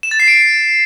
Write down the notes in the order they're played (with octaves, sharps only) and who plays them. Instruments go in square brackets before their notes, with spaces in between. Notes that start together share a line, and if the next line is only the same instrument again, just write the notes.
[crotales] E7
A6
C7
D7